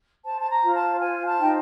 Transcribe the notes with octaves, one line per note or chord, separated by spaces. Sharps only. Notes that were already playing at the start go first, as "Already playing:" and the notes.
C5 A5
A5
A#5
F4
A5
C5 G#5
A5
D#4 G5